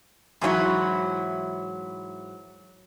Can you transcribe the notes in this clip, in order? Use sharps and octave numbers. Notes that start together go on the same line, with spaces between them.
G#2 E3 F#3 E4